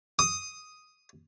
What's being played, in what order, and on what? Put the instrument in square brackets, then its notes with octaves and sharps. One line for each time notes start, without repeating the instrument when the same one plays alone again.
[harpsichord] D#6